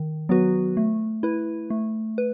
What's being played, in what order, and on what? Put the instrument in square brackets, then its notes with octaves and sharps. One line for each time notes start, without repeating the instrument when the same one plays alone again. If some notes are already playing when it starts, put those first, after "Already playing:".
Already playing: [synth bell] D#3
F#3 B3 F#4 B4
A3
E4 B4
A3
B4